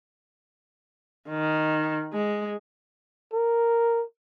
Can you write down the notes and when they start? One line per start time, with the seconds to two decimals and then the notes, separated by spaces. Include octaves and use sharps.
1.29 D#3
2.13 G#3
3.33 A#4